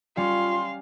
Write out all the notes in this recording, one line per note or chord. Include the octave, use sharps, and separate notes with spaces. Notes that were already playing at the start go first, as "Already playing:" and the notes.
G3 C#4 F4 F5 C6